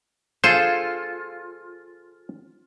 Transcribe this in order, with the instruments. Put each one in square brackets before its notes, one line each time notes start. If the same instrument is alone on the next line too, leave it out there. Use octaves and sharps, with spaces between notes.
[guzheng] F4 [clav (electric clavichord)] G#4 A4 C5